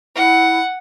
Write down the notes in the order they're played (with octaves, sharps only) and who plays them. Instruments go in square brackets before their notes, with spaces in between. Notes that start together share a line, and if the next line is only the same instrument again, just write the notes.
[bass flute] E4 [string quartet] F#5